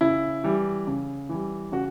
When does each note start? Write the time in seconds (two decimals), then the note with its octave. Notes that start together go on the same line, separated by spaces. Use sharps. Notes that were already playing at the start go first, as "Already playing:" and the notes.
0.01 C#3 E4
0.44 E3 G3
0.87 C#3
1.29 E3 G3
1.72 C#3 F#4